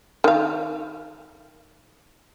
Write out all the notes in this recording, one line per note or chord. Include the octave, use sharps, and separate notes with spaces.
D#3 F5